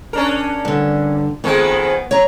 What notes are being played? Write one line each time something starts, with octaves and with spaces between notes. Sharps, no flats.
C#4 D4 A#4
G2 D3
F2 D#3 G#3 B3
C#5 A#5